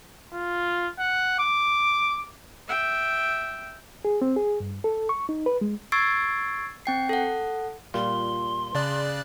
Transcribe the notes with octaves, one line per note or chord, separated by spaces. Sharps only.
F4
F#5
D6
E5 G5
G#4
C4
G#4
G2
A4
C#6
D#4
B4
G#3
C#6 E6 G#6 A6 C7 D7
C4 G5 C7
A4 F#5
A#2 G3 F4 C6
C#3 D5 A5 F#6